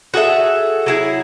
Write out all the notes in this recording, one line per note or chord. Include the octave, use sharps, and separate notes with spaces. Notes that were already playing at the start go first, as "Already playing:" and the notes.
F#4 G#4 A4 E5
F#3 E4 G#4